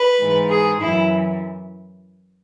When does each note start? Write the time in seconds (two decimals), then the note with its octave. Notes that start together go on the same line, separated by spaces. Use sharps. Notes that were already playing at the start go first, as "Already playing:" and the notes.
Already playing: B4
0.21 G#2 E3
0.50 G#4
0.80 F#2 E3 E4